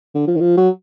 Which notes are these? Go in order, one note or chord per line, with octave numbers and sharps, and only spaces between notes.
D3
F3
D#3
F3
F#3